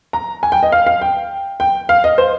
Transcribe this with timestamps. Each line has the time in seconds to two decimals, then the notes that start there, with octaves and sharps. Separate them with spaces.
0.13 A#5
0.43 G#5
0.52 G5
0.63 D#5
0.72 F5
0.87 F5
1.02 G5
1.60 G5
1.89 F5
2.04 D#5
2.18 C5